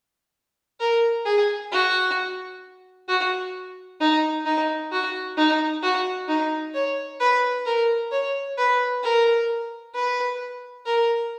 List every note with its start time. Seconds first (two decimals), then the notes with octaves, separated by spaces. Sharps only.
0.80 A#4
1.26 G#4
1.72 F#4
3.08 F#4
4.00 D#4
4.45 D#4
4.92 F#4
5.37 D#4
5.83 F#4
6.28 D#4
6.74 C#5
7.20 B4
7.66 A#4
8.12 C#5
8.58 B4
9.03 A#4
9.94 B4
10.86 A#4